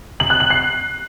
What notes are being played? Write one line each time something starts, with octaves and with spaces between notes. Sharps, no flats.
F#7
F#6
F#7
C7